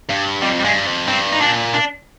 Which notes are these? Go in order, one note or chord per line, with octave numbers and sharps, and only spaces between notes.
G2
F2 G3
G3
G2 G#3
F2
G2 C4
D#4
A#2 D4
D4